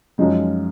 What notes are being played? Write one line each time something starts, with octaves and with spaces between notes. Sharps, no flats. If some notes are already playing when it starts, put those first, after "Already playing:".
F#2 F3 G#3 D#4